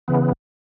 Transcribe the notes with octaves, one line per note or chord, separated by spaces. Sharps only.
C#3 E3 B3